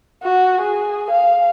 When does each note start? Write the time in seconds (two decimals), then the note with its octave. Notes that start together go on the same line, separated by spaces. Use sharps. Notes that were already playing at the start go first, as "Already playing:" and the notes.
0.23 F#4
0.61 G#4
1.10 F5